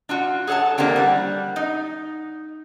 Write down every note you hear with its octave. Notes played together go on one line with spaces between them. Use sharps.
D4 F4 F#4
G#4 A4 C#5 F#5 A5
E3 A#3 C4 D4 G4
G3 F#5
D#4